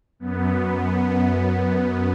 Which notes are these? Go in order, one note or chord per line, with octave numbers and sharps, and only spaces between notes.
F#2 B3